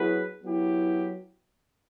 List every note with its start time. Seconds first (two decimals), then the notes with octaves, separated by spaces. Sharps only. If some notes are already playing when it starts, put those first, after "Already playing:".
Already playing: F#3 B3 E4 G#4 B4
0.43 F#3 B3 E4 G4